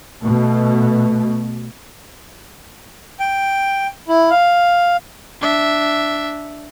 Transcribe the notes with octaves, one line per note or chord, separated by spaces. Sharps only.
B2 A3
G5
E4
F5
D4 E5